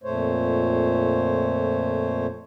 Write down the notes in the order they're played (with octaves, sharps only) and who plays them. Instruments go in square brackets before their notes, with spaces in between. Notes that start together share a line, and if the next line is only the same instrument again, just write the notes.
[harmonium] F2 A#2 A3 C5 C#5